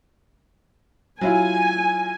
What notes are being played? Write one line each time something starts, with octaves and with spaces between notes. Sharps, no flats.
F#3 E4 F4 G#5